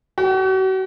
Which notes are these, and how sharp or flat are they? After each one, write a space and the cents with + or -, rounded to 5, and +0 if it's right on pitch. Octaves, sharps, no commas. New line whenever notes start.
F#4 +40